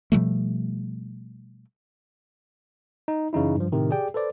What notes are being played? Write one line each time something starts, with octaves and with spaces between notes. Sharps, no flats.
B2 F3 G3 A3
D#4
F#2 C#3 E3 D#4 E4
G2 F3
A2 C3 D#3
G4 G#4 D5 G5
A4 B4 C5 D5